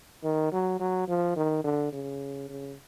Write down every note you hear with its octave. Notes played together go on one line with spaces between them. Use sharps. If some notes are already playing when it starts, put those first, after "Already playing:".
D#3
F#3
F#3
F3
D#3
D3
C#3
C#3